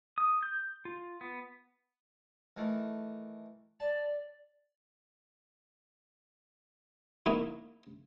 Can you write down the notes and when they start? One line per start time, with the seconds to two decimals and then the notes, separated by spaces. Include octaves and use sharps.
0.18 D#6
0.43 G6
0.85 F4
1.21 B3
2.57 D#3 E3 A3
3.80 D5 A5
7.26 A#3 D#4 E4